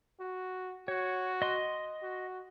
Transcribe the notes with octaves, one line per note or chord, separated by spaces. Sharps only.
F#4
F#4 C#5
D#5 C6
F#4